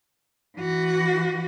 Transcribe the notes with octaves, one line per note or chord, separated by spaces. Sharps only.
E3 F#4